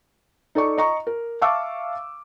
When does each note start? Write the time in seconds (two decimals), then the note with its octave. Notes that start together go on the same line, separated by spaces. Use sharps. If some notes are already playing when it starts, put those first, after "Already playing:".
0.55 D#4 A4 D5 C#6
0.78 D#5 A#5 C#6
1.07 A#4
1.42 E5 F5 A5 C#6 D6 E6